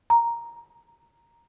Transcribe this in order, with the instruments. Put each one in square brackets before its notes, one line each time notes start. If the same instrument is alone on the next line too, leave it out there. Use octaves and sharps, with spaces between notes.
[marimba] A#5